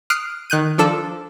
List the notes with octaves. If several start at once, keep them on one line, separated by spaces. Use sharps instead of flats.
D#6 F6 F#6 C7 D7
D#3 F#6 G6 D#7
F3 D4 A4 E7